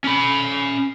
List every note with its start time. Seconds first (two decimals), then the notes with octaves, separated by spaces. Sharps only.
0.04 C#4 B5